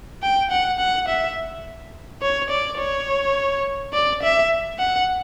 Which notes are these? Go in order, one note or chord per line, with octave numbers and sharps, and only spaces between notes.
G5
F#5
F#5
E5
C#5
D5
C#5
D5
E5
F#5